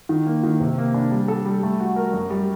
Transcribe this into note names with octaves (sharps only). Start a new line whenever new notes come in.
D#3
A#3
D#3
C3
A#3
D4
G3
A4
G3
A3
F#4
A#4
F#2
G3